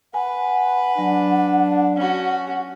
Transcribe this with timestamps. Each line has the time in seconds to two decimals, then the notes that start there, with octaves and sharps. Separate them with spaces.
0.14 B4 F#5 G#5
0.98 F#3 D4
1.96 C#4 F#4